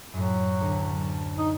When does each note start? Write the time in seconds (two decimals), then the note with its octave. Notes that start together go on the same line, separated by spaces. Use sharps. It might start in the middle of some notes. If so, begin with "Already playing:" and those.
0.13 F#2 A2 F#3
0.60 D2
1.01 A5
1.37 D#4